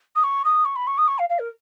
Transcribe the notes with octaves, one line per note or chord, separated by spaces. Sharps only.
D#6
C#6
D#6
C#6
B5
C#6
D#6
C#6
F5
F5
A#4